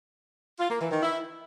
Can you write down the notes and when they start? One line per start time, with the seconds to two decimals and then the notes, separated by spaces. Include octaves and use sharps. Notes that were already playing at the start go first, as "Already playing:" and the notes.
0.59 F4
0.70 A#3
0.80 E3
0.91 D#3
1.02 E4